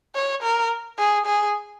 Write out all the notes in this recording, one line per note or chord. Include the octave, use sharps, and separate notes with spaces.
C#5
A#4
G#4
G#4